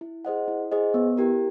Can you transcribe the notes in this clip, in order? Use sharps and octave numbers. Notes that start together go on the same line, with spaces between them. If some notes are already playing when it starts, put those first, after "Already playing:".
E4
G#4 C5 D#5 F#5
E4
G#4 C5 D#5 F#5
B3
E4 G4 A#4